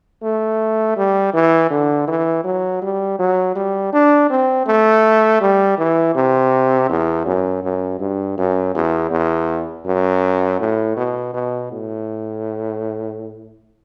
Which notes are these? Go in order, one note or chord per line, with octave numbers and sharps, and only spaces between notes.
A3
G3
E3
D3
E3
F#3
G3
F#3
G3
D4
C4
A3
G3
E3
C3
E2
F#2
F#2
G2
F#2
E2
E2
F#2
A2
B2
B2
A2